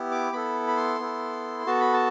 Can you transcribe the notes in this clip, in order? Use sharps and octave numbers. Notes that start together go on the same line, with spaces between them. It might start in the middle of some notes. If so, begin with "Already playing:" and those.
Already playing: B3 E4 G4
D6
B3 E4 A4 B5
B5
C6
B3 E4 A4
B3 F#4 A4 A5
B5
A5